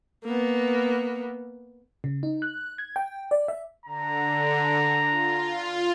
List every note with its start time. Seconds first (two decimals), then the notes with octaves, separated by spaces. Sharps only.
0.24 A#3 B3
2.04 C#3
2.23 D#4
2.42 F#6
2.78 G#6
2.96 G5
3.31 D5
3.48 E5
3.86 D3 A#5
5.10 F4